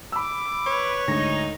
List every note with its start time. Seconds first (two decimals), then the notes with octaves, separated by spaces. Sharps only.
0.12 B5 D6 E6
0.66 B4 C#5
1.08 D2 G#2 D#4 A#6